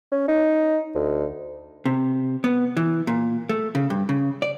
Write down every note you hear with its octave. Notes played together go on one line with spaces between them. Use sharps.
C#4
D#4
D2
C3
B3
E3
A#2
A3
C#3
G2
C#3
D5